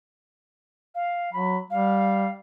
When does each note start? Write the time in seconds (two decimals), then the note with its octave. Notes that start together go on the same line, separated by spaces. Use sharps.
0.95 F5
1.33 F#3 B5
1.70 G3 F5